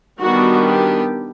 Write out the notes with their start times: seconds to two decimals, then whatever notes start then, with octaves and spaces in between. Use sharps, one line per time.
0.21 D#3 G3 B3 D4 F#4
0.68 G4